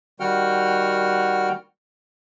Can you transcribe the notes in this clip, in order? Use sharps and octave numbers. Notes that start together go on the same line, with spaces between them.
D#3 G3 F#4 F#5 G5 F6